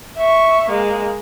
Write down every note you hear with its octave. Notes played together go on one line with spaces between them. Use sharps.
E5 C#6
G#3 A#3